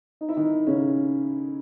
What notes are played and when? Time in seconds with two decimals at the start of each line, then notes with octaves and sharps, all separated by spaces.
0.21 D#4
0.29 E4
0.36 D#3 D#4
0.67 C#3 C#4